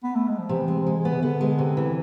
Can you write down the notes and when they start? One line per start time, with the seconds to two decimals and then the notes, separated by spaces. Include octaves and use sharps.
0.04 B3
0.16 A3
0.28 G#3
0.39 F3
0.49 C3 E3
0.68 G#3
0.87 G#3
1.05 B3
1.13 C3
1.22 D3 B3
1.41 G#3
1.59 C3
1.77 E3